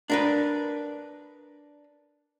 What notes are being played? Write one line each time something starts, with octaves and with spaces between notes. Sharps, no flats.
D4 A#4 B4